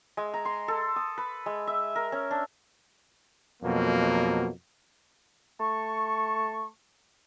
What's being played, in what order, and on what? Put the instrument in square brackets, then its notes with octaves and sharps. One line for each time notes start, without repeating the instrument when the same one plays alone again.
[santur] G#3
A#5
C6
A4
D#6
B4
G#3
E5
A#4
C#4
D4
[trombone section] F2 B2 F#3 A#3
[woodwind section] A3 A5 C#6